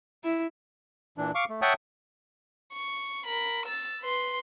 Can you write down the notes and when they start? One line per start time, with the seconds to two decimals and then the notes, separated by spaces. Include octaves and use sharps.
0.24 E4
1.18 A#2 E3 D4
1.35 F5 C#6 D6
1.49 A3
1.62 C#5 E5 F#5 G5 A5 D#6
2.73 C#6
3.26 A#4 B5
3.67 E6 A6
4.01 B4 C6